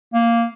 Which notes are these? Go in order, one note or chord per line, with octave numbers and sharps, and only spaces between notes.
A#3